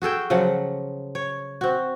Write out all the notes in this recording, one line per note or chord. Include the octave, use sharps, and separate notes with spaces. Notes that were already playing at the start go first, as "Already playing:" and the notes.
F#4 G#4 A4 G5
C#3 F3 F#3 F#5
C#5
C4 F#4